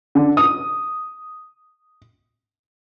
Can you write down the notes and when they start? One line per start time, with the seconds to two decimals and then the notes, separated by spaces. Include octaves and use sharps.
0.15 D3
0.37 D#6